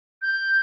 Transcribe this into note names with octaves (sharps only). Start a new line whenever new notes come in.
G6